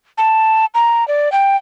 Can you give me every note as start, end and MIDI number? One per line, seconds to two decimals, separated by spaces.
0.18 0.66 81
0.75 1.07 82
1.08 1.31 74
1.32 1.56 79